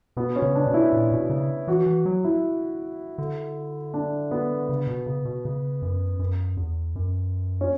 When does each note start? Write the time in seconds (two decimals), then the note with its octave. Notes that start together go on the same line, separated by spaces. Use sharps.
0.17 B2 B3
0.36 C#4
0.42 C#3
0.55 D4
0.67 B2
0.74 E4
0.93 A#2
1.12 B2
1.30 C#3
1.68 E3 F#4
1.86 E3
2.06 F#3
2.24 E4
3.18 D3
3.94 D4
4.31 B3
4.69 C#3
4.87 B2
5.06 C#3
5.25 B2
5.45 C#3
5.82 F#2
6.19 F#2
6.57 E2
6.96 F#2
7.61 C#4